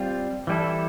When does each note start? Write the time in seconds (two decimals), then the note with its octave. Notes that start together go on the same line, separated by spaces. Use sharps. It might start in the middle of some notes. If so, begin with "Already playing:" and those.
Already playing: G3 C4 F4
0.47 E3 G3 B3 E4 A4